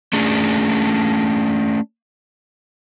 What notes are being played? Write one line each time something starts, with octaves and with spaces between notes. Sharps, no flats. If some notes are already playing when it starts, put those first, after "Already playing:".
A3 C#4 D4 G#4